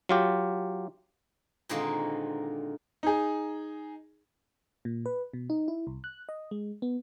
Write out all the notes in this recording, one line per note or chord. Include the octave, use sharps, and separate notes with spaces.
F#3 F4 G4
A#2 D3 D#3 G#3 A#3 C4
D#4 G#4
A#2
B4
B2
D#4
E4
C2
F#6
D#5
G#3
B3